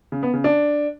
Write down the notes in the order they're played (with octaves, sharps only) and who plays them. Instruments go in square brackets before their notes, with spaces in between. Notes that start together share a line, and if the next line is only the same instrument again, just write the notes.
[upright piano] C#3
B3
C#3
D4